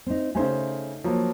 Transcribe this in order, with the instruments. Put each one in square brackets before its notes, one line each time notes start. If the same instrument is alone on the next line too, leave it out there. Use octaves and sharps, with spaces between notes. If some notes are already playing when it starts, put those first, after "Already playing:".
[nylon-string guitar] C4 D#4
[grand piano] C#3 C5 G#5 [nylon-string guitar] A3 D#4 G4
[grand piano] F3 F#3 A#3